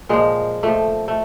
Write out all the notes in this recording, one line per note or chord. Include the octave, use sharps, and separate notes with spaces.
A#2 F3 G#3
A#2 F3 A3
A3